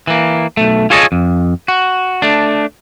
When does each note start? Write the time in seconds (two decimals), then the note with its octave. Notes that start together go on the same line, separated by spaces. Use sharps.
0.07 E3 A#3
0.57 B1 A3
0.90 F4 G#4 A4 C#5 D#5
1.12 F2
1.68 F#4
2.22 A3 D4